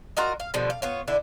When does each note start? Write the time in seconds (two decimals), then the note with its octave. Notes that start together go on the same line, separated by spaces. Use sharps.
0.17 F4 F#4 A#4 D#5
0.40 F5
0.54 B2 D3 F3 G3
0.70 F5
0.82 B3 F4 C#5
1.08 D3 D4 E4